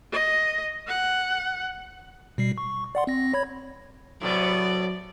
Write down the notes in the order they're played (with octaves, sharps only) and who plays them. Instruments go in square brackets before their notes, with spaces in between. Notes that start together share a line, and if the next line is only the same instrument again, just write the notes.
[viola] D#5
F#5
[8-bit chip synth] B2 G3 C7
C#6
D5 F#5 C6
C4 A#6
C#5 B5 G#6
[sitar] A2 C3 B3 [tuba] F#3 [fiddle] D5